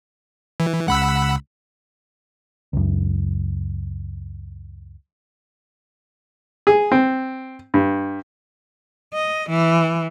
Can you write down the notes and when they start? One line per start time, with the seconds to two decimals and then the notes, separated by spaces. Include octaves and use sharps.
0.60 E3
0.88 C#2 C#3 G#3 F#5 B5 E6
2.73 C#2 F#2
6.67 G#4
6.92 C4
7.74 G2
9.14 D#5
9.49 E3